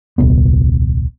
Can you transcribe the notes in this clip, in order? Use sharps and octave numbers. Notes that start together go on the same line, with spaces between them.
D#1 C2 B3